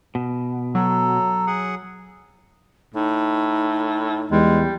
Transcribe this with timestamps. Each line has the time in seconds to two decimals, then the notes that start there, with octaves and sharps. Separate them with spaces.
0.15 B2
0.75 F#3 A4 A#5
1.47 G#4 F#5
2.95 A2 D#4
4.31 E2 G3 G#3